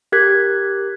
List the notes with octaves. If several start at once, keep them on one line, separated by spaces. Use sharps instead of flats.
G4 A#4 F#6 G#6 B6